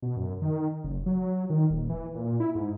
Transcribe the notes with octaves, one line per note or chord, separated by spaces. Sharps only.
B2
F#2
D#3
F#1
F#3
D#3
D#1
E3
A#2
E4
G#2